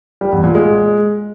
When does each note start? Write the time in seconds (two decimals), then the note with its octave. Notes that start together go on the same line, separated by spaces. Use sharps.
0.21 G3
0.32 E2
0.44 A#2
0.55 G#3